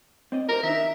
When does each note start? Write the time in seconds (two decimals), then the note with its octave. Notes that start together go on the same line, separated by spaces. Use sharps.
0.32 C4 D5 D#5
0.49 E4 G4 A#4 C5
0.63 D#3 D4 D#4 E5